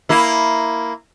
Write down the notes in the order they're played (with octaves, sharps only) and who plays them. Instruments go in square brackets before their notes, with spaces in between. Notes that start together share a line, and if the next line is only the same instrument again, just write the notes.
[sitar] A#3 E4